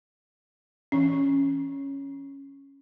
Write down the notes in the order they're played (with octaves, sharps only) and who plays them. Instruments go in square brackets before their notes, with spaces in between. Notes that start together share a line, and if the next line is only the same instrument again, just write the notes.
[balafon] E3 C#4